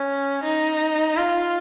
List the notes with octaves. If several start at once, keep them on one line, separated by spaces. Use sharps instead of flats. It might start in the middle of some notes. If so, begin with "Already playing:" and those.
Already playing: C#4
D#4
F4